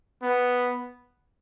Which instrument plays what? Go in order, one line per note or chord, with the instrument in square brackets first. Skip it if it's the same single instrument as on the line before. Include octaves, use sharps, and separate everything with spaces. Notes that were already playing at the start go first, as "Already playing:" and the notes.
[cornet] B3